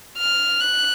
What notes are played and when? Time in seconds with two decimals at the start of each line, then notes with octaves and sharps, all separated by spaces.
0.18 F6
0.61 F#6